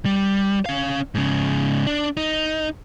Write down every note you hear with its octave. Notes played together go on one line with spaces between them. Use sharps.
G3
C#4 F5
G#2 C#3
D4
D#4